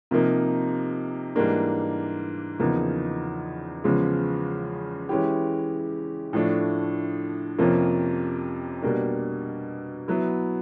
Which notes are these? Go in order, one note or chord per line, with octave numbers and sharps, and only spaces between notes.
C3 F3 A#3 D#4
G#2 E3 G3 A#3 D4
E2 C#3 F3 A#3 D#4
E2 C#3 F3 G#3
E3 G#3 C#4 E4 G4
A2 F3 A3 D4
F2 C3 F3 A#3 C#4
B2 G3 A#3 D4
F#3 B3 E4